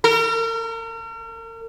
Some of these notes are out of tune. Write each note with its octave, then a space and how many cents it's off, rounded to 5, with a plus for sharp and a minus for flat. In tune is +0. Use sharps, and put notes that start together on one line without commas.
A#4 -40